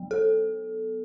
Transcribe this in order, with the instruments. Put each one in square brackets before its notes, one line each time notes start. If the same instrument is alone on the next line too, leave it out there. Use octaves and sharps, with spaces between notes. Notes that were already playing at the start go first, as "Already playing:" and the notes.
Already playing: [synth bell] F#3 B3
A4